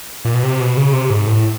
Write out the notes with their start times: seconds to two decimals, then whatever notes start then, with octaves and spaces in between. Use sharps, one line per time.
0.25 A#2
0.34 B2
0.43 C3
0.61 B2
0.77 C#3
0.93 C3
1.10 G#2
1.27 A2